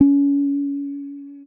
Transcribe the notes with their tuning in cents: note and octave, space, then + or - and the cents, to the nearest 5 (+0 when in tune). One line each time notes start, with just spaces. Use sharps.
C#4 +30